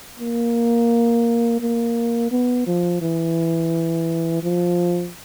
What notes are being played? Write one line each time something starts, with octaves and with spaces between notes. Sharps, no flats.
A#3
A#3
B3
F3
E3
F3